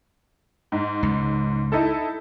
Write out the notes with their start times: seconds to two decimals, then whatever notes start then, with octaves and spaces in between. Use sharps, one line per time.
0.72 G#2
1.03 C#2
1.72 D#4 E4 A4